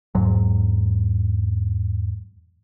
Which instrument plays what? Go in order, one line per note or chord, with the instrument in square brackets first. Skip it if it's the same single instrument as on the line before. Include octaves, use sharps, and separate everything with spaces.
[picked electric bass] E2 G#2 F#3